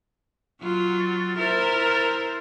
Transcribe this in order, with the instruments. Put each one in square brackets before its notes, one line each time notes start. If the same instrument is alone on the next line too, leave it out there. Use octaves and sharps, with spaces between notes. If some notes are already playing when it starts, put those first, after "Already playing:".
[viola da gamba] F#3 F4
[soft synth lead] A6
[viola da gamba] E4 A#4 C5